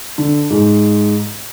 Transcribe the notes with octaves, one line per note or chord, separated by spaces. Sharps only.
D3
G#2